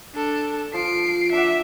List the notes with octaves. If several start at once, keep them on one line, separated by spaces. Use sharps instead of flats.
D4 A4
F3 F4 C7 D7
D4 D5 E5 F#5